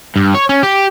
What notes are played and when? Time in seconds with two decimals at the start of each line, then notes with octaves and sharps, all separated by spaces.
0.16 G2
0.34 C#5
0.49 C#4
0.63 G4